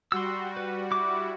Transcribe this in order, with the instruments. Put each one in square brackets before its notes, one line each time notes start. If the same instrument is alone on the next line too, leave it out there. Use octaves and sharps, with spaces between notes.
[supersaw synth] G3 F#4 [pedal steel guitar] C6 E6
[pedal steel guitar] B4
E4 D6